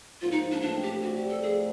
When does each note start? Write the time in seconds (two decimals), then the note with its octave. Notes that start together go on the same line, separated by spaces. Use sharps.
0.21 G#2 F3 A#3 C#4 F4
0.32 D#4
0.52 D4
0.62 A2 E3 A3 C4 D4
0.82 G4
1.02 G2 D3 G3 F#4
1.16 G4
1.29 A4
1.43 A2 F3 A3 G#4